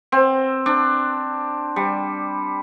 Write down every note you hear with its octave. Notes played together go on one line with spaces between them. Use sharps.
C4
D4
G3